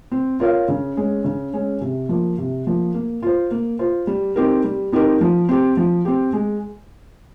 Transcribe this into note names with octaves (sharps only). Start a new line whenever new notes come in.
C4
F4 A#4 C#5 F5
C#3
G#3 C#4
C#3
G#3 C#4
C3
F3 A#3
C3
F3 A#3
A#3
F4 C5
A#3
F4 C5
G3
C4 D#4 G4 A#4
G3
C4 D#4 G4 A#4
F3
C4 G4
F3
C4 G4
G#3